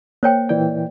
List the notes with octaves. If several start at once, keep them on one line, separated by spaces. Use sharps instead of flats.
A#3 C5 C#5 G5
A#2 E3 D5 G5